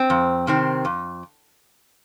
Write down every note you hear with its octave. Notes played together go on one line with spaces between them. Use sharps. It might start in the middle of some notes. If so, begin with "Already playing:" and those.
Already playing: C4
F2
C3 D#3 C4
F2